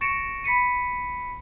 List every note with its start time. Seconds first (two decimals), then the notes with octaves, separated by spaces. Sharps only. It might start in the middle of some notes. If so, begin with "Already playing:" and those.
0.01 C#6 A6 A#6 C#7 D7 E7
0.44 B5 B6 C#7 D#7